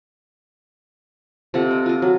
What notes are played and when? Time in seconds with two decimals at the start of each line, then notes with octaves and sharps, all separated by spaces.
1.54 C3 F4 A4 F#5
1.71 D#5
1.86 F4 D#5
2.02 F#3